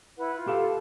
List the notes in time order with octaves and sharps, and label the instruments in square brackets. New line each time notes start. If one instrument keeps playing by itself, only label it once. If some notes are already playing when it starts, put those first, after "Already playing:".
[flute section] E4 B4 F#5
F4
[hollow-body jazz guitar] G4 A4 F5
[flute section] A5